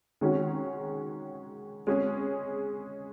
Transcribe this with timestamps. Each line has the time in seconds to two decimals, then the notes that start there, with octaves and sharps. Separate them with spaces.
0.21 D#3 G#3 C#4 F#4
1.87 G#3 C#4 G#4